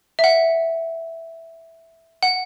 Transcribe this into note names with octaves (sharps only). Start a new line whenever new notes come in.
E5
F#5
F#5